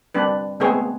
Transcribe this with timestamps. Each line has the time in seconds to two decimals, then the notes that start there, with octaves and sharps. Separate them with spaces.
0.15 G3 C4 D4 B4
0.60 G#3 A3 B3 C4 G#4 C#5